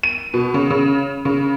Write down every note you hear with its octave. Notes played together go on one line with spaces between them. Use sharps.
D#7
B2
C#3
C#3
C#3